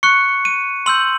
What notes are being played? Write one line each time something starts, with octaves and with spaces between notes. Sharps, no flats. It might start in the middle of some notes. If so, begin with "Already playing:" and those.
C#6 F#6 C#7
D#7
C6 E6 G6 F#7